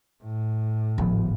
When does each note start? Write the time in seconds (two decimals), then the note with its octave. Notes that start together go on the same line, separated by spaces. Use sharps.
0.23 A2
0.98 D1 G#1 F3 B3